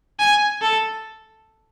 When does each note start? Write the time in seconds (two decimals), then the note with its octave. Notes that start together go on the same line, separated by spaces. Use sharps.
0.19 G#5
0.62 A4